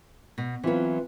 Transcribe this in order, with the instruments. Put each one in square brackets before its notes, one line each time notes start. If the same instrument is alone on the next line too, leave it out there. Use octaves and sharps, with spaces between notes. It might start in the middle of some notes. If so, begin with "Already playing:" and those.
[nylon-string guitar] B2
[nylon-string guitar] E3 F#3 [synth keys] C4 F4 B4